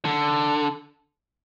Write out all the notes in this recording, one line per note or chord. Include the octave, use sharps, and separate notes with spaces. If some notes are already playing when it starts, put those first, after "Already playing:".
D3